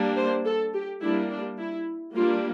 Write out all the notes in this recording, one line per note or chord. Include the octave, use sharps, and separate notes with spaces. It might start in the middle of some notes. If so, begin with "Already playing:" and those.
Already playing: G3 A#3 D4
C5
A4
G4
G3 A#3 D4 E4
D4
E4
G3 A#3 D4 F4